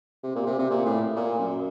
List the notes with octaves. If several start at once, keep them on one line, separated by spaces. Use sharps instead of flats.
C3
A#2
C3
C3
A#2
A2
A#2
F#2